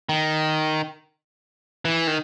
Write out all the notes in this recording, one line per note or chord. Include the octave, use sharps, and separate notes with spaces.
D#3
E3
D#3